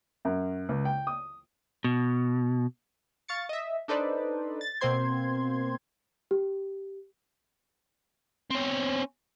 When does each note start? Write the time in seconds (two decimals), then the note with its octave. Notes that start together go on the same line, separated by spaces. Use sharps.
0.25 F#2
0.69 C#2
0.85 G5
1.07 D#6
1.84 B2
3.28 F5 C#6 A6 C#7
3.49 D#5 E5
3.88 D4 D#4 A4 B4 C5 D5
4.61 A6
4.81 B2 A#3 C4 C5 C6 G#6
6.31 G4
8.51 C4 C#4